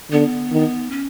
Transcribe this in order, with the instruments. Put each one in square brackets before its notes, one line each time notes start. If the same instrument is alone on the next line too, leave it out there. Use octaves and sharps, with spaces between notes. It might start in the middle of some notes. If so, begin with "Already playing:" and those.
[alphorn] D3 [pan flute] B3
[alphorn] D#3
[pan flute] C#4